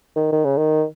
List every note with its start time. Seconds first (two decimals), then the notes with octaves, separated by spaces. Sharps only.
0.16 D#3
0.32 D#3
0.45 C#3
0.57 D#3